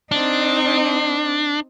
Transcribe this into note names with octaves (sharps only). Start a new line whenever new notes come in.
C4 D4 D#4